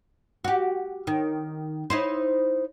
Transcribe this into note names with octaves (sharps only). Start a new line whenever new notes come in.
F#4 G4
D#3
D#4 E4 C5